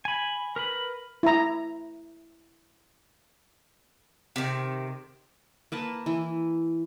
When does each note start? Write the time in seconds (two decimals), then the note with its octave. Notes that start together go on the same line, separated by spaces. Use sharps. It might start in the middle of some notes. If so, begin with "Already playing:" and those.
0.05 G#5 B5
0.56 A#4 B4 B5
1.23 E4 A#5
4.36 C3 D#3
5.72 A#3 B4 A5
6.06 E3 E4